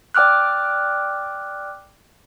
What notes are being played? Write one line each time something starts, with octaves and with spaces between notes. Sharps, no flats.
D5 G5 D6 F6 F#6